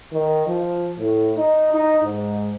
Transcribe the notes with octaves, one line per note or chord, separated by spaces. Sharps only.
D#3
F3
A2
D#4
D#4
G#2